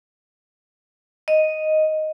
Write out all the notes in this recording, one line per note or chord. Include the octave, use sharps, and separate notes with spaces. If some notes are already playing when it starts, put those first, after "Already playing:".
D#5